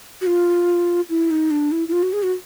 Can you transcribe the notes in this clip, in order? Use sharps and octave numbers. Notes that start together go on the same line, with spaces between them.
F#4
F4
E4
D#4
D4
E4
E4
F4
F#4
G#4
F#4